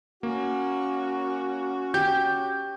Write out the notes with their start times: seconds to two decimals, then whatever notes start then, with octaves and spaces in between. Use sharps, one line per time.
0.23 A#3 C#4 F#4
1.94 G4 G6